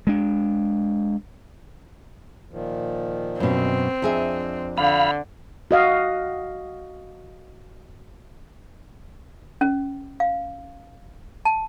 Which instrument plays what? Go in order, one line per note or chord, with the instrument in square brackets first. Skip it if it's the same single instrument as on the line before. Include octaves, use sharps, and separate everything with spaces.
[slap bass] G#3 D4
[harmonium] A#2 D#3 F3
[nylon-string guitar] F#2 B2 [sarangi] C4
[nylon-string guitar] F2 G#4 E5 [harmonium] D4
[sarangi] D3 [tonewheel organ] F5 B5
[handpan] F#4 D#5 F5
[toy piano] C#4
F5
A5